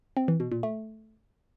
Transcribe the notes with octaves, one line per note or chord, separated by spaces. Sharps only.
C4
E3
B2
A#2
A3